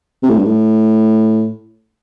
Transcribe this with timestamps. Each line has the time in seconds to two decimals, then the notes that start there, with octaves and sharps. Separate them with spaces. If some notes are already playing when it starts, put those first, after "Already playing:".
0.23 C3
0.30 A2
0.37 G2
0.45 A2